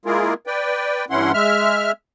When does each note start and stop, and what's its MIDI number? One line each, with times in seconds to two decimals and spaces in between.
0.05 0.34 56
0.05 0.34 58
0.05 0.34 64
0.05 0.34 65
0.05 0.34 68
0.05 0.34 70
0.47 1.05 71
0.47 1.05 74
0.47 1.05 79
1.10 1.32 43
1.10 1.32 52
1.10 1.32 61
1.10 1.32 64
1.10 1.32 78
1.10 1.32 84
1.34 1.92 56
1.34 1.92 76
1.34 1.92 89